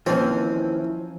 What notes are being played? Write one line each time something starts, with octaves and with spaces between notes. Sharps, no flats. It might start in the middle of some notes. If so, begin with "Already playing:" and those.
D#2 E3 F3 C4 C#4